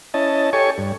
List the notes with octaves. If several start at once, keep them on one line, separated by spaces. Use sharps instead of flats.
C#4 E4 D#5 A5
G4 A4 C#5 G#5 C#6
G2